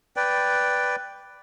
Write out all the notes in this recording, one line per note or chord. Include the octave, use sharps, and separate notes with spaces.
B4 D5 G5